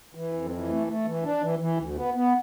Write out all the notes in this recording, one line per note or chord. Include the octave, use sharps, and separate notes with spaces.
E3
F2
E3
A3
A3
E3
D4
E3
E3
D2
B3
B3